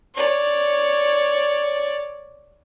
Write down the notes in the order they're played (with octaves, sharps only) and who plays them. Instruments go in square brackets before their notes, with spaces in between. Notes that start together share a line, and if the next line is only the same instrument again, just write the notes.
[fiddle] C#5 D5